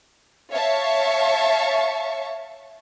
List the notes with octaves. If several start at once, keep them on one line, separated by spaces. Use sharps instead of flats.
C#5 E5 F5 A5 C#6